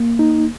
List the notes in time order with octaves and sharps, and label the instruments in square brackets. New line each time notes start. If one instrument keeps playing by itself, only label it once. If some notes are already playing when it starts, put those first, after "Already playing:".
Already playing: [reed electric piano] A#3
D#4